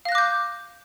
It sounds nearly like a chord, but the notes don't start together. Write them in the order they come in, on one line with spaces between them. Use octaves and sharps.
F5 A#6 F#6 D6 G6